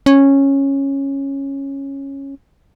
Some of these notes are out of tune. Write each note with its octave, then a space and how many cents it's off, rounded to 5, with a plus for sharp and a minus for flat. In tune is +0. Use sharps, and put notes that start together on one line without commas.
C#4 -10